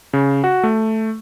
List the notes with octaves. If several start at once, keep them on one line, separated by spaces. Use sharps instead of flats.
C#3
F#4
A3